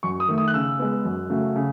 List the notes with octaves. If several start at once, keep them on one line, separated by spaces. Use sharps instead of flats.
F#2 C#6
D#6
D#3 A3
D#6
F#6
C#3 E6
G#3 B3
F#2
C#3 F#3 A3
C#3